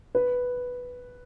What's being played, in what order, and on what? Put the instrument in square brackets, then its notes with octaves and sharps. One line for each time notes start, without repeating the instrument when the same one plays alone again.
[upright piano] B4